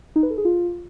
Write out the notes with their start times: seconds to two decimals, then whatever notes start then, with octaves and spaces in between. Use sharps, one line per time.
0.16 D#4
0.23 B4
0.30 A4
0.38 G#4
0.45 F4